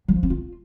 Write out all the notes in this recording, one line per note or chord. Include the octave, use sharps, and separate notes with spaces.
F#3
F3
C4
F4